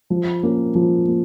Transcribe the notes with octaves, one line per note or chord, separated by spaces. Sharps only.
F3
A#3 C#4
F3
A#3